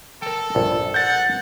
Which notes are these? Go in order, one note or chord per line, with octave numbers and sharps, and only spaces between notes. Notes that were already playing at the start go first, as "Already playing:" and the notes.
A4 A#4 G5
A#1 G2
F#5 G6 A6